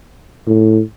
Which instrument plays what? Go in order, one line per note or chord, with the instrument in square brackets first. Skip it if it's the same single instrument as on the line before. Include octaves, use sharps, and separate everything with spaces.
[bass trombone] A2